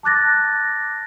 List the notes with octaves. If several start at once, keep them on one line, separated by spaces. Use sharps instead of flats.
A5 D6 F#6 A6 A#6